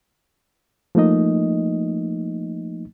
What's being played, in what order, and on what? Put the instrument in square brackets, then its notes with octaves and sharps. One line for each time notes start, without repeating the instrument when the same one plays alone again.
[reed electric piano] F3 A3 A#3 D#4 D#5